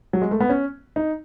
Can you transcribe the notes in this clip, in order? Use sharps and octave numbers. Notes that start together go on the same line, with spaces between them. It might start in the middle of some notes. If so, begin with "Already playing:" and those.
F#3
G#3
A3
B3
C#4
D#4